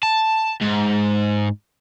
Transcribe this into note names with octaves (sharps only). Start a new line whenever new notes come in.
A5
G#2